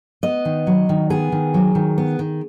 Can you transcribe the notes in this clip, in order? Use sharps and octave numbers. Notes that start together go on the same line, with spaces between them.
B3 D#5
D#3
F#3
D#3
B3 G#4
D#3
F#3
D#3
B3
D#3